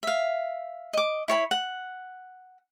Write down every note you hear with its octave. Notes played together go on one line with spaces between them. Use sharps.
E5 F5
D#5 D6
E4 C#5 G#5 B5
F#5